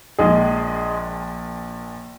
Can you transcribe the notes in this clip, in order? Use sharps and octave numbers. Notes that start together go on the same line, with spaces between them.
A#1 A#2 G#3 G#4